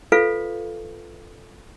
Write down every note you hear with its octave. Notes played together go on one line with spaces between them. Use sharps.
F4 A4 B4 F5